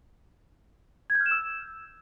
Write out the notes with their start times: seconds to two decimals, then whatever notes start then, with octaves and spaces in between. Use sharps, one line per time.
1.10 G#6
1.15 G6
1.20 F6
1.26 E7
1.31 E6